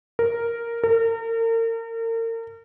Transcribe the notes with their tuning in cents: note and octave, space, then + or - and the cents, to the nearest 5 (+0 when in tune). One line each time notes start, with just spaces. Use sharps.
A#4 -5
A#4 -40